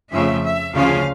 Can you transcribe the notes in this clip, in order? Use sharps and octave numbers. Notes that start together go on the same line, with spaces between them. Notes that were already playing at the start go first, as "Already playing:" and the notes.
F2 C#3 F3 A3 E5
E5
D2 C#3 F3 C#4 F4 F5